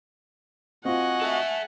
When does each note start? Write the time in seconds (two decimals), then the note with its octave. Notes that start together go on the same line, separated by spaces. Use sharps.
0.85 C4 F4 F#4 D#5 F#5 G#5
1.21 A4 E5